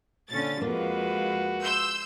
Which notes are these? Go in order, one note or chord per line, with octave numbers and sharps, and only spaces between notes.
A#2 D3 C#4 A6
F2 G#3 A#3 F4 F#4 B4
C6 E6 G6